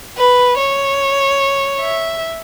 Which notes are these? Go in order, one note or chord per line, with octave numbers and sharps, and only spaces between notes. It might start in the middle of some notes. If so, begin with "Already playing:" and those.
B4
C#5
E5